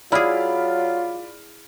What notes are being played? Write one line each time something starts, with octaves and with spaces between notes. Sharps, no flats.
F#3 E4 F4 G#4 D5 B5 F6